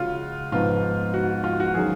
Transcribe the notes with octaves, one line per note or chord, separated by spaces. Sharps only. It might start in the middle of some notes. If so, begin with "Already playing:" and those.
Already playing: C#3 G#3 C#4 F4 F#4
G#2 F3 B3 D#4 F4
F#4
F4
F#4
D#3 F#3 C#4 G#4